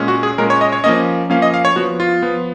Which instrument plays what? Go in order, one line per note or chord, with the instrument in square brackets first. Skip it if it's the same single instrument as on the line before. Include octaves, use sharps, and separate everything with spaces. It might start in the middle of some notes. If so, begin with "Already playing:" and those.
Already playing: [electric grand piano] A#2 G#3 C#4
F#4
G#4
A#2 G#3 C#4 A#4
C#5
D#5
C#5
F3 A#3 C#4 D#5
F3 A#3 C#4 F5
D#5
F5
C#5
F3 B3 F#4
F4
F3 B3